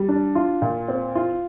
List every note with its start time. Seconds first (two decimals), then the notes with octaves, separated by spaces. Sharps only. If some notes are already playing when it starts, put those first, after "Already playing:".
Already playing: G3
0.09 D4
0.35 F4
0.62 A#2
0.88 C4
1.15 F4